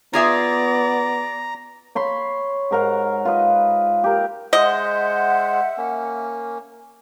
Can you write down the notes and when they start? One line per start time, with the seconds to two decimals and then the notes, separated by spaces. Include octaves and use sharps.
0.13 B3 F4 G#4 D5 E5 A#5
1.95 C#5 B5 C6
2.71 G#2 A#4 F#5
3.25 F4 B4 D#5
4.04 G4 A#4
4.53 G#3 C5 D#5 E5 F#5
5.78 A#3 C#4